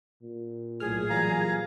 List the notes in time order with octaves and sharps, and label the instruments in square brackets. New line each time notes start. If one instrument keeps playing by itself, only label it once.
[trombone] A#2
[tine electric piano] B1 A2 F6 [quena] G#4
[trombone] A#2 [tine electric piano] E3 F#3 G3 [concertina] F5 A#5